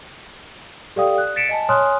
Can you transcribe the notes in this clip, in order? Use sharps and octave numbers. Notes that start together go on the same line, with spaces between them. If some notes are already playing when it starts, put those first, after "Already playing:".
G4 A4 D5 F5 G5 D#6
F#6
A6 B6 C#7 D7 E7
D#5 G#5 A5
C#5 G#5 C6 D#6 F6 F#6